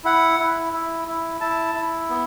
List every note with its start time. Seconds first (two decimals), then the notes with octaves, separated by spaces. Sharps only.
0.05 E4 F#5
0.40 E4
0.73 E4
1.08 E4
1.41 E4 A5
1.75 E4
2.10 B3